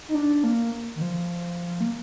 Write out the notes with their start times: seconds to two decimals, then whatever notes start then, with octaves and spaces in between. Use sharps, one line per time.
0.09 D#4
0.15 D4
0.44 A#3
0.96 D#3
1.01 F3
1.80 A#3